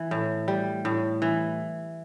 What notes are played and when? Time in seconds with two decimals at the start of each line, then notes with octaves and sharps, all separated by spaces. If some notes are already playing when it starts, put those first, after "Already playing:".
Already playing: E3
0.11 A2
0.48 G3
0.85 A2
1.22 E3